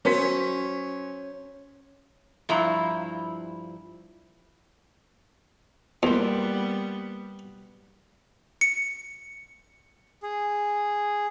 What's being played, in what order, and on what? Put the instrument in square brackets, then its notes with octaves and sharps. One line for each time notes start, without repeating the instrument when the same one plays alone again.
[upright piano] F#3 C5 B6 [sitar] C#4
[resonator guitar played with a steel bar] G2 F3 E4 A#5
[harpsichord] E2 [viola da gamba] G3 B3 [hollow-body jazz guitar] A#3 C5
[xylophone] C#7
[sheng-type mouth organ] G#4